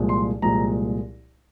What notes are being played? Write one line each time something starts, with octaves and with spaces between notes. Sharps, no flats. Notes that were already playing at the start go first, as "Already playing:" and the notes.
Already playing: C2 A#2 F3 G#3
C6
C2 A#2 F3 G#3 A#5